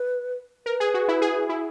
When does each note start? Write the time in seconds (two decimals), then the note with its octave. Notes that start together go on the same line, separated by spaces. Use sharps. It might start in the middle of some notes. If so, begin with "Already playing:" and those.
Already playing: B4
0.66 A#4 B4
0.80 G#4
0.94 F#4
1.08 E4
1.22 G#4
1.49 E4